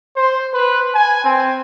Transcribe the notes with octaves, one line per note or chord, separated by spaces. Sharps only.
C5
B4
G#5
C4